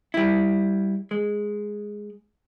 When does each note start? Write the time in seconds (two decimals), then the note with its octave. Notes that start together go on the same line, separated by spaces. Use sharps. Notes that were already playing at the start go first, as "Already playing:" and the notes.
0.14 G3 E4
1.11 G#3